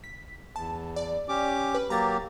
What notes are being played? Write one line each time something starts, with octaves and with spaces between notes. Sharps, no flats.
B6
E2 A5
D5
C#4 G4 D6
B4
F#3 A#3 G4 A#5 A6